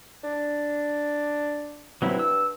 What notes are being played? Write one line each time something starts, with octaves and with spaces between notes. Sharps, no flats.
D4
G2 F#3 C4 E4
E6